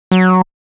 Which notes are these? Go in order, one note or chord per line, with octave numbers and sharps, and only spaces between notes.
F#3